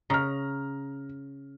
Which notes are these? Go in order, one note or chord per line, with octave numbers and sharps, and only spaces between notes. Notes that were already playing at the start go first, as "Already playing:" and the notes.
C#3 A#5 F6